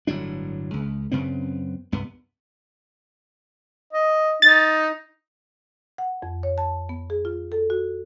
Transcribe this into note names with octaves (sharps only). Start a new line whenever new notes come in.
G1 A2 F#3 D4
C#2
F#2 C#3 B3 C4
C2 G2 B3
D#5
D#4 A6
F#5
F2
C#5
A5
B3
G#4
F4
A4
F#4